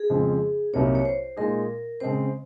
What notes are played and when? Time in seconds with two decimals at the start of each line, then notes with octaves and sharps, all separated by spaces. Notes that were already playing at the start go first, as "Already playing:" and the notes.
Already playing: G#4
0.10 F2 C#3 F3 G#3
0.73 C2 C3 F#3 A#3 D#4 C#5
0.95 C#5
1.05 C5
1.37 A#2 G#3 D#4 G#4 A#4
2.00 C#3 G#3 C4 C5